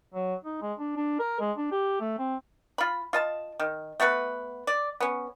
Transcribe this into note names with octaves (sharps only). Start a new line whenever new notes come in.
F#3
D#4
G#3
D4
D4
A#4
G#3
D4
G4
A3
C4
F4 B5
F4 D#5 A5
D#3
A3 B3 F#4 B4
D5
B3 C#4